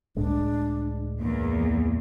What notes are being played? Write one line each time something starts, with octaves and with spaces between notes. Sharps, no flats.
C#2 A2 G#3 D4
E2 A#3